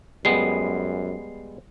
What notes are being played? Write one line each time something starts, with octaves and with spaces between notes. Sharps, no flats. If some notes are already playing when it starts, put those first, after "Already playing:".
F#2 G3 G#3 B3 C7